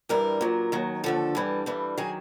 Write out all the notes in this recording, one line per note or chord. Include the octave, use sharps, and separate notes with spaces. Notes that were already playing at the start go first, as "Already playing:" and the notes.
G2 E3 G3 A#4
A#2 F#3
D#2 D#3 F#3
D#2 D3 F3 A4
G2 E3 G3
G2 E3 G3
D#3 F#3 G#4